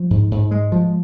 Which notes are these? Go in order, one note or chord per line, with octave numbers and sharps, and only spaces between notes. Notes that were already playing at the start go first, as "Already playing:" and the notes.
Already playing: F3
G#2
G#2
G#3
F3